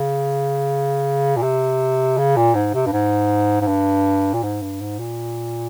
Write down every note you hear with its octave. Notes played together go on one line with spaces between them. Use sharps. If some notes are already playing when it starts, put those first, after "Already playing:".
Already playing: C#3
A#2
C3
C#3
A#2
G#2
C3
G2
G#2
G#2
G2
A#2
G#2
G2
G#2
A#2